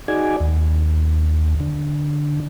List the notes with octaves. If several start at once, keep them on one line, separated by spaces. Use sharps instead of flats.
D#4 F#4 G#4 D5 G#5
D#2
D3